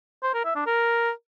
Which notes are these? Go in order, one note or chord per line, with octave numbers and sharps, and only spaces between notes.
C5
A#4
E5
D4
A#4